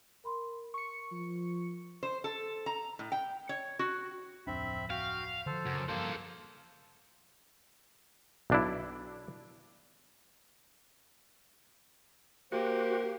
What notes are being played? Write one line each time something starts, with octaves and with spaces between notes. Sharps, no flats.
A#4 B5 C6
C#6 C#7
F3
C5
A4
A#5
A2
G5
C#5
F#4
D1 F2 C4 D4 E5 B5
F#4 F5 G5
D3 F3 A4 C5
F#2 C#3
G2 F3 A#3 A4 C5
B1 D4 E4
A#3 F#4 G4 C5